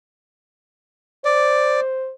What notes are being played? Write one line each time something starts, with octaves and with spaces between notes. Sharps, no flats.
C5 D5